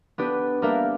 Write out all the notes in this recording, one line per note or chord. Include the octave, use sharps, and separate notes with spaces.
B3 D4 G4 B4
G3 A#3 D4 A#4 E5